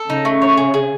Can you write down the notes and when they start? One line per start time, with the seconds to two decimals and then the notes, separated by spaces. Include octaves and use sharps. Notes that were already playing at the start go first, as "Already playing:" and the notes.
Already playing: A4
0.09 C#3 D#4
0.25 A3
0.42 C#5
0.57 G#4
0.74 G#4